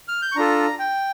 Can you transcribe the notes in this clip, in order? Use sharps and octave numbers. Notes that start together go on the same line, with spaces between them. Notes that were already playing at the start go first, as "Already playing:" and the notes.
F6
G6
C#6
D4 F4 A4 A#5
G5